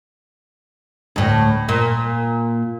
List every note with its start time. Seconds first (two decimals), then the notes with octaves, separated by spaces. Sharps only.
1.16 D2 A2
1.69 A#2